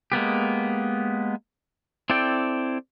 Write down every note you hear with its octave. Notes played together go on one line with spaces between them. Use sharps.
G#3 A#3 B3 G4
C4 E4 A4 D5 G5